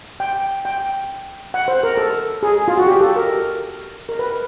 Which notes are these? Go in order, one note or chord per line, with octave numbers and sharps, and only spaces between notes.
G5
G5
F#5
C5
A#4
A4
G#4
F4
F#4
G4
A4
A#4
A#4
B4